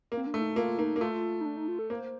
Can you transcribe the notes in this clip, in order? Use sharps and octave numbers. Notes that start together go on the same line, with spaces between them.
A#3
C4
D4
A3
D#4
A#3 F4
A#3 D#4
A#3
A3 F4
D#4
D4
D#4
F4
A4
A#3 C5